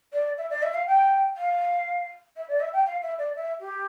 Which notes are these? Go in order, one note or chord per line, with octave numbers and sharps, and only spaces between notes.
D5
E5
D5
E5
F5
G5
F5
E5
D5
E5
G5
F5
E5
D5
E5
G4